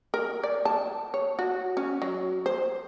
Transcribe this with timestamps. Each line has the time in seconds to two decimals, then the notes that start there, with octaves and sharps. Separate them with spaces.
0.14 A#4
0.44 D5
0.65 A5
1.14 C#5
1.39 F#4
1.77 C#4
2.02 F#3
2.46 C5